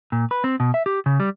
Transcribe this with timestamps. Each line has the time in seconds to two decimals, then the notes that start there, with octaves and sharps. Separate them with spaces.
0.12 A#2
0.31 B4
0.44 C4
0.60 B2
0.74 E5
0.86 G4
1.06 C#3
1.20 G3